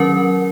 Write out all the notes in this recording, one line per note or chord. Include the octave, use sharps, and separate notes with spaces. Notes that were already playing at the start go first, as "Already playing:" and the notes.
Already playing: D#3 F#3 C#4 A#4